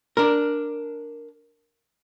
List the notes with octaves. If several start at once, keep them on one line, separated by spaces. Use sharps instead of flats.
D4 A#4